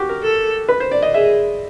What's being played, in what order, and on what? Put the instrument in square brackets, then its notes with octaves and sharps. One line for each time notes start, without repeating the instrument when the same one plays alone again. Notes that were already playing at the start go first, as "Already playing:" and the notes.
Already playing: [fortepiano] F#4 G4
A#4
[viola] A4
[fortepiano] B4
C5
D5
D#5
[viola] G#4 [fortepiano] E5